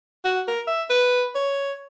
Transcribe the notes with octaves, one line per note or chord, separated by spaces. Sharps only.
F#4
A#4
E5
B4
C#5